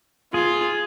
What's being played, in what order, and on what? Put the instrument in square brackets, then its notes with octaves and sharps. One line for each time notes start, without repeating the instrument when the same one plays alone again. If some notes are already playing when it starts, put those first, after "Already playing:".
[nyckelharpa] F4 [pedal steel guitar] G#4